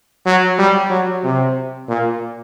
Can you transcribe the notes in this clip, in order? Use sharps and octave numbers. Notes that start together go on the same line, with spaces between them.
F#3
G3
F#3
C3
A#2